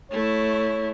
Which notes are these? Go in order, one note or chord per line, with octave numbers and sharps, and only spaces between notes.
A3 E4 C#5